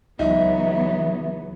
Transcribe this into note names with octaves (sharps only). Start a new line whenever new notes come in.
C#2 E3 F#3 B3 D#4 E5